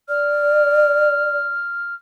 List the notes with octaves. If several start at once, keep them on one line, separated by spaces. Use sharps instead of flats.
D5 F6